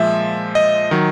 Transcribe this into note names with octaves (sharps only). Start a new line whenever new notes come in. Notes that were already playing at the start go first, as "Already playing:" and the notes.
Already playing: A#2 F3 G#3 E5
D#5
D#3 F#3